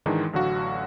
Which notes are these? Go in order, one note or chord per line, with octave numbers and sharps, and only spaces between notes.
G#2 D#3 E3 G#3 D4 D#4
A1 D3 F#3 F#4 F5